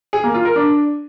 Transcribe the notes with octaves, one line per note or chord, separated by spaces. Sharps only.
G#4
A#3
F4
A#4
D4